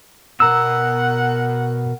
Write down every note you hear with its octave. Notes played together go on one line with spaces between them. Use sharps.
B2 A#4 F#5 A#5 E6